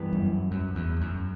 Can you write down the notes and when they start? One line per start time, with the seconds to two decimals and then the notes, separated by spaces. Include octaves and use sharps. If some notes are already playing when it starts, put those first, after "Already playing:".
Already playing: G2 E3 B3
0.13 F#2
0.51 F#2
0.75 E2
1.01 F#2